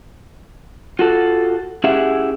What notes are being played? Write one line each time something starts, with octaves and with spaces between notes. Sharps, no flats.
F4 F#4 A4
C#4 E4 G4 G#4 E5 F#5